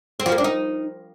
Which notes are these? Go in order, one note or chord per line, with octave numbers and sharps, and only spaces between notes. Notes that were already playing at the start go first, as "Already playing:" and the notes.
C4
F3
A#3
D4
D#4